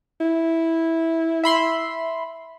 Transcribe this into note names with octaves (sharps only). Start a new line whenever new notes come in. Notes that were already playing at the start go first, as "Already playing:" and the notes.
E4
E5 B5 C6